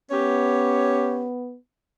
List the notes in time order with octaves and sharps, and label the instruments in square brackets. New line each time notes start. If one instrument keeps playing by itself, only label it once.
[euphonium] B3 [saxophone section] C#4 G4 C#5